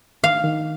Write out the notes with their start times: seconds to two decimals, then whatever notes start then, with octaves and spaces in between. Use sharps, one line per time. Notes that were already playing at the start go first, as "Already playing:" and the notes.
0.23 D#3 F5
0.44 D#3